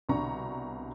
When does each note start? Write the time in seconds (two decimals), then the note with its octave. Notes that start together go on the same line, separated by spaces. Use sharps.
0.09 C2 B2 D3 D4 A#5 C#6